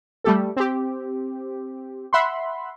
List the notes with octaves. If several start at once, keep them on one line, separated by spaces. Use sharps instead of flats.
G3 A3 G4 A4
C4 G4
E5 F#5 B5 C6